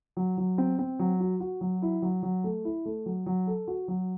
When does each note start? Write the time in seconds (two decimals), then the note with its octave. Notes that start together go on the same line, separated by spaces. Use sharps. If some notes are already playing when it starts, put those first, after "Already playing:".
0.17 F#3
0.38 F#3
0.58 C4
0.79 C4
0.99 F#3
1.20 F#4
1.40 F#4
1.61 F#3
1.82 E4
2.02 F#3
2.23 F#3
2.44 A3
2.65 E4
2.86 A3
3.06 F#3
3.26 F#3
3.47 A4
3.67 F#4
3.88 F#3